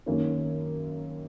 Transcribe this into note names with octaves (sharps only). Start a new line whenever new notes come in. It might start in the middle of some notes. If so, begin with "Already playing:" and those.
F#2 D#3 A#3 C#4